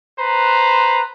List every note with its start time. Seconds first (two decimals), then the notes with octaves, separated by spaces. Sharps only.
0.18 B4 C5 A#5